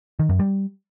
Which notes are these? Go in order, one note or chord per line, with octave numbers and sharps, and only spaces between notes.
D#3
F#2
G3